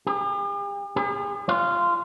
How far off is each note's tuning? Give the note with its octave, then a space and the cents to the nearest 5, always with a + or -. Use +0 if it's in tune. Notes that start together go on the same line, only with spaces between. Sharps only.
G4 +45
G#4 -45
F4 -15